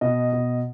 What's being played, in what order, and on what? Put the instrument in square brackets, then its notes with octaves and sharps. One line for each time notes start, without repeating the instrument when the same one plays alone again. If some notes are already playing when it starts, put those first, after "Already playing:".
[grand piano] B2 D#5
B2